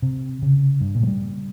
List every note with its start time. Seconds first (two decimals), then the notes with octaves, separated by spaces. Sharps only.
0.02 C3
0.42 C#3
0.81 G2
0.95 A#2
1.03 G#3
1.07 G3